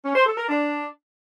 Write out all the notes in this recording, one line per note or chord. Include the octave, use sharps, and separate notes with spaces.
C#4
C5
A4
A#4
D4